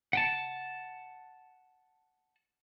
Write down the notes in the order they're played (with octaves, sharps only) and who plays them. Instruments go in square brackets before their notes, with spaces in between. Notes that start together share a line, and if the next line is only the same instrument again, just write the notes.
[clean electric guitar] F#5 G5 A5